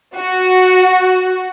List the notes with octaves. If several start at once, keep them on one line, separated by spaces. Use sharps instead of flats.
F#4